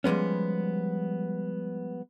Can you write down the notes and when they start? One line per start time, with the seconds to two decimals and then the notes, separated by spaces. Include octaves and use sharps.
0.04 F3 G3 G#3 B3 C#4